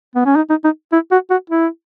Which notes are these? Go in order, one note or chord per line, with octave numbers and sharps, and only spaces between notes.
B3
C#4
D#4
D#4
D#4
E4
F#4
F#4
E4